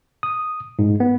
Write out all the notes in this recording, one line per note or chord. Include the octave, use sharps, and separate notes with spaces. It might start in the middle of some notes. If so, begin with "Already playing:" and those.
D#6
G#2
B3